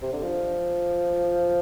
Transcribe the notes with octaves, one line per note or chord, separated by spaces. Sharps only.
C3
D3
F3